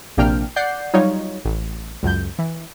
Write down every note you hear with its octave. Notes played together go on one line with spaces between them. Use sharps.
A#1 C3 A#3 D4 G5 F6
D5 F#5 G6 C7
F#3 G3 D#4 F4 C#5
A1
C#2 F#2 G6
E3